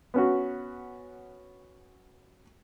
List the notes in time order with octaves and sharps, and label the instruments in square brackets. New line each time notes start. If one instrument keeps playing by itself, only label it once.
[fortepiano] B3 C#4 F#4